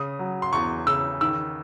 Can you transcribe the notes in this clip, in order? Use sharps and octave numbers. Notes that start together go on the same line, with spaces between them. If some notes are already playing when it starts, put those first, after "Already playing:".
Already playing: C#3 D#6
F#3
C6
E2 C#6
C#3 E6
D#3 E6